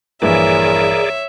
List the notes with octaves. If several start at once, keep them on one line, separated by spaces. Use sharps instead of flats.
A#1 G2 E3 G#4 A#4 C#5 D5 E5